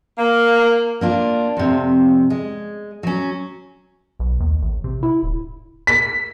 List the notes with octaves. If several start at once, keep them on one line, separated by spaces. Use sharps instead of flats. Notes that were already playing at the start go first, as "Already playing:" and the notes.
A#3
A#3 D4 F4
F2 C3
G#3
F#3 C#4
B1
D#2
A1
C3
E4
D1
B6